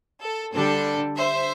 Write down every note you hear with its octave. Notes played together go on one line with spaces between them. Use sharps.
A4
D3 G3 D4 A4
C5 E5